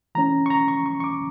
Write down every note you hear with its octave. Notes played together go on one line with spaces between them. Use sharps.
E3 A3 C#4 A#5
C#6
A#5
C#6
C#6
C#6
D6